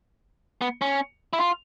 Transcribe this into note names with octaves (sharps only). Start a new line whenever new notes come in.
B3
C#4
E4
F4